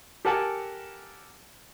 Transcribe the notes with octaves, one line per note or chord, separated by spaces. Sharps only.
G4 A4 A#4 F#5 G#5 A5